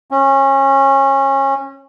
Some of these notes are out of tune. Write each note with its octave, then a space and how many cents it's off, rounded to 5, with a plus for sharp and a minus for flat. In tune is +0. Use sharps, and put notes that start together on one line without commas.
C#4 -25